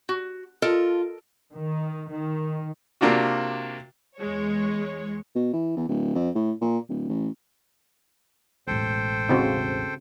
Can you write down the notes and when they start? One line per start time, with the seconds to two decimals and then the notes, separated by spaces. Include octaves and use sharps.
0.09 F#4
0.62 F4 A4 A#4 D#5
1.55 D#3
2.13 D#3
3.01 C3 A#3 D4 F4 F#4
4.18 E2 G#3 C#5
5.35 B2
5.53 E3
5.76 E2
5.88 D1
6.15 F2
6.35 A2
6.61 A#2
6.89 D1
7.09 A1
8.67 E1 A1 A4 C5 G5
9.29 C#3 C4 F#4